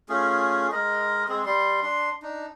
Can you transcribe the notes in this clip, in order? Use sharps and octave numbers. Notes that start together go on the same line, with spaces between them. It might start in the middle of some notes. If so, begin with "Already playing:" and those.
A3 C#4 F4 G#4
G#3 A#4 D#5
G#3 C4 G#4
G3 C6
D4 C6
D4 D#4